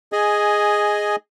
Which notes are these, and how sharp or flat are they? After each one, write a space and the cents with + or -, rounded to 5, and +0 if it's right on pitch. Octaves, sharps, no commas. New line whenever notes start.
G#4 +0 D#5 +0 G#5 +10